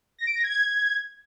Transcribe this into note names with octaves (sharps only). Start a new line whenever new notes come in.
A#6
D7
A#6
G#6